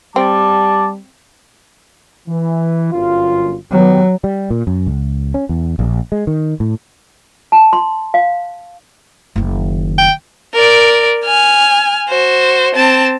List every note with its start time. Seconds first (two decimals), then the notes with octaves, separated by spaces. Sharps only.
0.16 G3 C4 A5 D6
2.28 E3
2.93 G1 F#2 F4
3.72 D#3 F#3 B3 G4
4.24 G3
4.50 A#2
4.67 F#2
4.87 C#2
5.34 C#4
5.49 E2
5.79 A#1
6.12 G#3
6.27 D#3
6.60 A2
7.52 A5
7.73 C6
8.14 F5
9.36 F#1 D#3
9.98 G5
10.54 A#4 D5
11.25 G#5 F6
12.09 F#4 C5
12.75 C4 A5